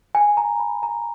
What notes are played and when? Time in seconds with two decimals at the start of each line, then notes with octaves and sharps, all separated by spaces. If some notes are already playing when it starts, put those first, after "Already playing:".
0.15 G#5
0.37 A#5
0.60 B5
0.83 A#5